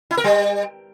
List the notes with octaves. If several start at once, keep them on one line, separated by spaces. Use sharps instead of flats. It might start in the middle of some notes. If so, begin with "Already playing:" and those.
E4
A#4
G3